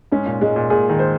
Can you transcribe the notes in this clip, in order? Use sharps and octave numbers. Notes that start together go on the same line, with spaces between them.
G#2 C#4
A#2
G#2 G#3
A#2
A#2 G#4
D#3
C5